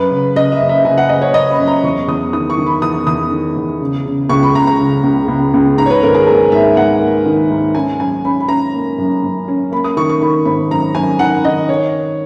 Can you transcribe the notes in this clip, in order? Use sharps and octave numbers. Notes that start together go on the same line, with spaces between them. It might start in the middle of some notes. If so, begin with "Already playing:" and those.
Already playing: F#2 B4
C#3
C#3 D#5
E5
F#1
E5
C#3 G#5
F#5
F#1 D#5
C#5
F#1 D#5
B5
F#2
A#5
E2 C#6
E2 D#6
D#3 D#6
C#6
D#3
B5
E2 D#6
E2 D#6
D#3
E2
C#3
C#3
C#2 C#6
B5
C#2 A#5
A#5
C#3
C#2
C#2
C#2
G#2 A#5
C#5
B4
G#1 A#4
G#4
A#3 G#4
G#2 E5
G#2 F#5
A#3
D#3
G#2
C#4 G#5
F#2 G#5
C#4 B5
B5
C#4 A#5
A#3
F#2
F#2
C#4
A#3 B5
D#6
D#3 C#6
C#6
D#3 B5
G#1 B5
F#2 A#5
F#2 G#5
D#3 F#5
D#3 D#5
C#5